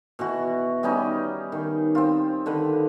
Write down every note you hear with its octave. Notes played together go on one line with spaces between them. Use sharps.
B2 E3 F#4
G3 B3 C#4 D#4
D#3
C4 F4
D3 D#3 B4